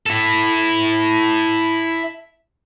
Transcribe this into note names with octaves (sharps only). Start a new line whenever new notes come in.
E4 A4